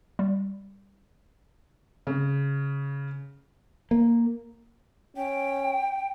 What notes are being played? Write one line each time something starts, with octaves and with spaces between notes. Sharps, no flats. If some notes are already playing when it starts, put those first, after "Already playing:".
G3
C#3
A#3
C#4 G5